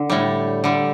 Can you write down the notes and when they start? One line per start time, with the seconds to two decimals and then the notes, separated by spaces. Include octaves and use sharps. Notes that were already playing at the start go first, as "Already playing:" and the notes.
Already playing: D3
0.10 A2 G3
0.64 D3 G3